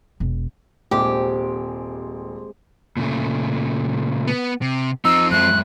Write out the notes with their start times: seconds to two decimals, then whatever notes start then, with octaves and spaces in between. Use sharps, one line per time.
0.20 E1
0.91 D#1 C3 G#3 G4
2.97 A#2 C#3 A3
4.27 B3
4.62 C3
5.05 F3 C4 D#4 E6
5.31 F#2 G#3 E5 F#6